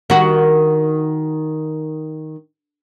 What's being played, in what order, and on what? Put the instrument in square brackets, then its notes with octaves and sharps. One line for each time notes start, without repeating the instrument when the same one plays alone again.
[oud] D#3 F#4